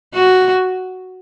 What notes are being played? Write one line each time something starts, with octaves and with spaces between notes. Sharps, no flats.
F#4